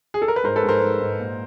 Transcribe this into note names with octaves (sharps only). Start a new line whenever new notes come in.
G#4
A4
A#4
B4
G#2 A#4 C5
A4 B4
G#2
A#4 C5
G#2
G#2
A#2